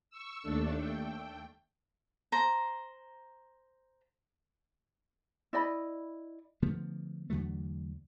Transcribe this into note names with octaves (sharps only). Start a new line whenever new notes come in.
C#6 E6
D#2 A3 D4 A4
G5
C5 A#5
E4 D5 D#5 B5
D3 F3 A3 B3
E2 D3 F#3 A3